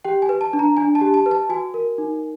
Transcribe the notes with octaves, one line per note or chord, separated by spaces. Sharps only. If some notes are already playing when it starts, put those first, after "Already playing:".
G4 G5
G#5
B4
A5
D4
A#5
D4 G#5
A5
G4
A5
B4
A5
F#4 G#5
A#4
D#4